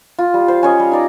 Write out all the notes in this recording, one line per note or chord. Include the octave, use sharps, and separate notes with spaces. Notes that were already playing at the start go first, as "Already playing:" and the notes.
F4
G3
C5 F5
C#4 C#5 D#5
G3
D#4 D5 A#5